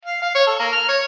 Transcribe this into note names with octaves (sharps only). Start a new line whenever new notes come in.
F5
F5
C#5
A4
A#3
F6
C#5